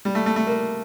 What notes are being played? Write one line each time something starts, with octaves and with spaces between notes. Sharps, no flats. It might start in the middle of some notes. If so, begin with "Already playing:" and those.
G3
A3
A3
A3
A#3